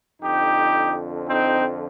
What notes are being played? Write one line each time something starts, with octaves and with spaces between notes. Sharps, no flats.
F2 D3 F3 D#4 G4
C4 D#4